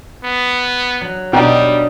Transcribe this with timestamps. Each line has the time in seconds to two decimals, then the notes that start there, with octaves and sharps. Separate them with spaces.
0.24 B3
1.01 F#3
1.33 B2 G3 D4 D#4 G5 A#5